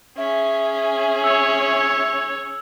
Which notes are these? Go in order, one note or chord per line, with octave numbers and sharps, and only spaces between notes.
C#4 G#4 E5
C#5 E6 G#6